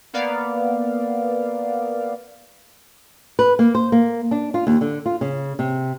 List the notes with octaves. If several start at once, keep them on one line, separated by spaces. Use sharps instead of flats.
A#3 B3 D5 F5
B4
A#3
C5
A#3
D4
F4
D#2
D3
F4
C#3
C3